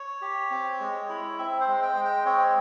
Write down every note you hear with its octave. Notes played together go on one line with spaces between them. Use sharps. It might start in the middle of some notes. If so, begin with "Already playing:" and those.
Already playing: C#5
G4
C4
G#3
E4
C4 E5
C5
G#3
G5
G#3
G5
C4 C#5